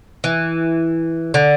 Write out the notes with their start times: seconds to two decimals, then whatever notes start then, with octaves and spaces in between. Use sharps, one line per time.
0.24 E3
1.34 D3